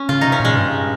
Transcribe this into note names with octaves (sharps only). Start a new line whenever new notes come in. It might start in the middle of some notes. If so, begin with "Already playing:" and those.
Already playing: C#4
C#3 F4
C3 D#4
C#4
A#2 G#3
G2